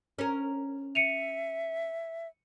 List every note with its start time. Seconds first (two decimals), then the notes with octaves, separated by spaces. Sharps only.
0.19 C#4 A#4
0.95 E5 C#7 D#7 F7